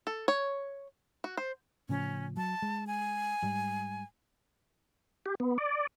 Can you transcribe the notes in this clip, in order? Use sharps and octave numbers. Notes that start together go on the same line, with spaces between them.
A4
C#5
F#4
C5
A2 C#3 F3 C#4
F#3 A5
G#3
G#5
G#2 G3
G4
B3
D5